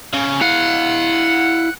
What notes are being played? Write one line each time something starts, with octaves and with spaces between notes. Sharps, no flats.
C#3 C#4
E4 F5 F#5